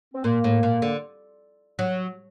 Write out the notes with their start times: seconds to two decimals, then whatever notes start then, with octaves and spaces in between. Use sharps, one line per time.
0.14 C4
0.24 A#2 A#3
0.44 A2
0.63 A#2
0.82 D3
1.79 F#3